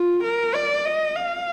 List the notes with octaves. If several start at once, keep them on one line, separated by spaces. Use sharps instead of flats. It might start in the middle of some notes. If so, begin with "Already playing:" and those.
Already playing: F4
A#4
D5
D#5
F5